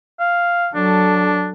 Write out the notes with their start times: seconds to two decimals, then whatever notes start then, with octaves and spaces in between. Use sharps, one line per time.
0.20 F5
0.75 F#3 D4 A4